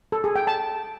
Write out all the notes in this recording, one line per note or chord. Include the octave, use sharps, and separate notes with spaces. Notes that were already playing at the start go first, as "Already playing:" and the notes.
A4
G#4
G5
A5